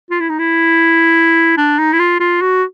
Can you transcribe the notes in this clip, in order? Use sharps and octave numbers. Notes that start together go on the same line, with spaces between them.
F4
E4
D#4
E4
D4
D#4
E4
F4
F4
F#4